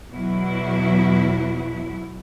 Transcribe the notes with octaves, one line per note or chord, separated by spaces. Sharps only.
E2 B2 F#3 E4